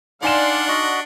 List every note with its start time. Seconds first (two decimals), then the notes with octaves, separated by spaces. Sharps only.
0.23 D4 D#4 D5 F5 F#5 G#5 C6 E7
0.68 F#4 D#5